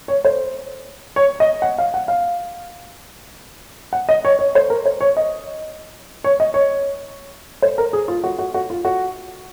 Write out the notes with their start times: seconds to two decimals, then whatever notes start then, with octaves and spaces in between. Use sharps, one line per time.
0.08 C#5
0.25 C5
1.16 C#5
1.40 D#5
1.62 F#5
1.78 F5
1.94 F#5
2.08 F5
3.93 F#5
4.09 D#5
4.25 C#5
4.39 C#5
4.55 C5
4.70 A#4
4.86 C5
5.01 C#5
5.17 D#5
6.24 C#5
6.40 D#5
6.54 C#5
7.62 C5
7.78 A#4
7.93 G#4
8.08 F4
8.24 F#4
8.39 F#4
8.54 F#4
8.70 F4
8.85 F#4